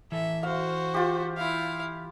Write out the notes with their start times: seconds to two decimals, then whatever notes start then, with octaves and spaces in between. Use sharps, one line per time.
0.12 E3 A4 E5
0.43 F#4 C5 F5
0.94 F4 G4
1.37 E4 F5